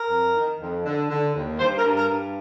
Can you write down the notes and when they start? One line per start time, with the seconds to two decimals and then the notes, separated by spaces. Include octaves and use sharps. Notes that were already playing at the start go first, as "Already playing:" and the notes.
Already playing: A#4
0.11 F2
0.35 D#3
0.60 F2
0.86 D3
1.10 D3
1.35 D#2
1.60 G2 C5
1.78 A#4
1.85 G2
1.97 A#4
2.09 G2